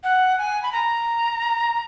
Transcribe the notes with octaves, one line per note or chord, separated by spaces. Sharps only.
F#5
G#5
B5
A#5